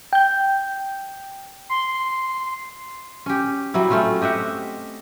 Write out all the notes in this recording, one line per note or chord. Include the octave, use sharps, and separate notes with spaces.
G5 G6
C6
C#4 G4
F#3 G3 E4
A3 C4 C#4 F4
G4 D#5 E5 F#5